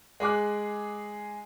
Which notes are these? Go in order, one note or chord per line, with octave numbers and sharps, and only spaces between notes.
G#3 G#4 D6 F#6